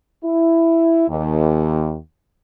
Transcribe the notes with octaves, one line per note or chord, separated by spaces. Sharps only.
E4
D#2